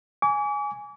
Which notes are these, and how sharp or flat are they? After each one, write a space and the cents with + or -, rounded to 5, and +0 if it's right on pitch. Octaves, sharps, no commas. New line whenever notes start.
G#5 +0 D6 -40